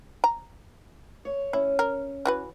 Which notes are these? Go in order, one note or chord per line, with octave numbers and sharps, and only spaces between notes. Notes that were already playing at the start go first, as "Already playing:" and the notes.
A#5
C#5
C#4 E4
A#4
E3 F#4 B4